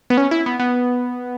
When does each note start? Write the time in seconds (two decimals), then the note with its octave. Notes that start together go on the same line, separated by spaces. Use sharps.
0.10 B3
0.17 C#4
0.31 E4
0.46 B3
0.59 B3